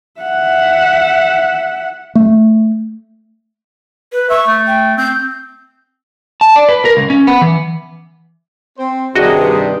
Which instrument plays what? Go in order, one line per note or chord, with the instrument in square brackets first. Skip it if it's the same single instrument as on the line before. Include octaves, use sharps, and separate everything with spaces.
[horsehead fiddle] E5 F#5
[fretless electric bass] A3
[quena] B4
[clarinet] E5 [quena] C#6
[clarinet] A3
[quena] G5
[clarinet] C4 [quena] G6
[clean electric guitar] A5
D5
B4
A#4
C#2
C#4
B3
E3
[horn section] C4 C5
[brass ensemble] G2 C3 [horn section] D#3 D4 D#4 [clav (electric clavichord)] F#4 D#5 [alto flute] G#4